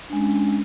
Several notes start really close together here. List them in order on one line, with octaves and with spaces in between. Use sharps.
D4 G#3 C#4